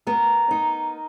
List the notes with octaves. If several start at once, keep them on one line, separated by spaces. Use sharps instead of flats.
B3 A#4
D#4